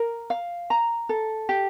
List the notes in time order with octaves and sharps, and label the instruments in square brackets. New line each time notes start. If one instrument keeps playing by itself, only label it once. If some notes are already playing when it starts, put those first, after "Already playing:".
Already playing: [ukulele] A#4
F5
A#5
A4
G4